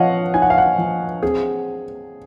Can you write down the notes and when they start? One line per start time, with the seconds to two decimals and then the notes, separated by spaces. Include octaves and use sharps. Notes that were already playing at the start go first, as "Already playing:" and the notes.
Already playing: F3 C4 C#5 D#5 F5 F#5
0.34 D#4 G#5
0.42 F#5
0.50 F5
0.58 F#5
0.78 F3
1.23 C4 G#4